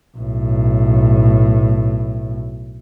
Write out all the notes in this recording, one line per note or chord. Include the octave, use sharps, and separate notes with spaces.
B1 A2